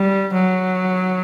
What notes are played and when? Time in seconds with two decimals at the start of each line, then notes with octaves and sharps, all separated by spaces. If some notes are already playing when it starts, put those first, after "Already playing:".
Already playing: G3
0.33 F#3